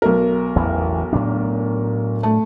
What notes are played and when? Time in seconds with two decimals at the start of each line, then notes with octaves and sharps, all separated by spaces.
0.02 B1 A#4
0.56 A1 E2 E3
1.13 A2 F#3 D4
2.23 A3